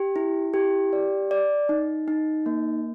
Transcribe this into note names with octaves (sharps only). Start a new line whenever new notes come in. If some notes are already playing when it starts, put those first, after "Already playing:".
Already playing: G4
E4
G4
D5
D5
D#4
D#4
A#3